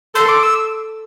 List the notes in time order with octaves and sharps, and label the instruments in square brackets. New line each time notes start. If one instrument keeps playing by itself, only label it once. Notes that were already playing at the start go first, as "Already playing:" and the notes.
[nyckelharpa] A4 [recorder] C6
[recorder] D6
E6